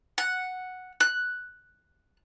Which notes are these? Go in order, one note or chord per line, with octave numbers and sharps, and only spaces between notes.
F#5
F#6